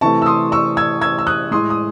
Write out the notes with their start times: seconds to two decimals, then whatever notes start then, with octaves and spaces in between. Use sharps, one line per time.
0.01 C3 E3 A3 A5 C#6
0.22 E6
0.26 C6 D#6
0.52 C#6 E6
0.77 E6 G#6
1.01 E6 G#6
1.19 E6
1.27 D#6 F#6
1.51 A2 G#3 C6 D#6
1.70 D#6